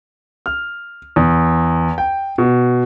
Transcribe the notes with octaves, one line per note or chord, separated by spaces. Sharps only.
F6
E2
G5
B2